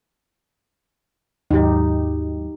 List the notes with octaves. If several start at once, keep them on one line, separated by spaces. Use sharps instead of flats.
D#2 G#2 F#3 D#4 G4